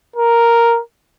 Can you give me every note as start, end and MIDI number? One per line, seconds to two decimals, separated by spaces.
0.16 0.80 70